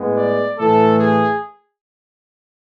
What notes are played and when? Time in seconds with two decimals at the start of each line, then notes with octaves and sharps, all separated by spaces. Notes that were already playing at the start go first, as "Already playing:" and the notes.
Already playing: A2 G#3 B3
0.16 D5
0.58 A2 E3 A3 A4
0.98 G#4